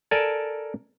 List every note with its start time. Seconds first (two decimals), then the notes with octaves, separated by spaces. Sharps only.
0.11 A4 A#4 D5 G#5 A5